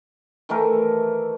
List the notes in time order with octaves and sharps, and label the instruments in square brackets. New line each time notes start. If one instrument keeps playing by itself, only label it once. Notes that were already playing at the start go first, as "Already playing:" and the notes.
[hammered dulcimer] D#3 E3 A3 A#4